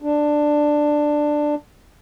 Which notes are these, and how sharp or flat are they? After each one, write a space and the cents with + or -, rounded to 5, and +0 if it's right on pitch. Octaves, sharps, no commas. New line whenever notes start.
D4 +10